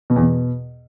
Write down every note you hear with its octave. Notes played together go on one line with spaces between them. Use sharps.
B2
E2
B2